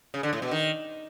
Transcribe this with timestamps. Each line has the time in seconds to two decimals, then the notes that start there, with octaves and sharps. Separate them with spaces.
0.14 C#3
0.23 D3
0.33 A2
0.42 B2
0.51 D#3